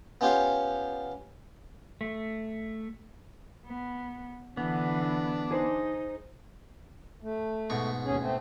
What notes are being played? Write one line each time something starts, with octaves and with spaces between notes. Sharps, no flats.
B3 C#4 F4 G4 C#5 F5
A3
B3
D3 E3 B3 D4
D#4 G#4 C5
A3
G#2 B2 C#6
D#2 C#4 G#4
A3 C4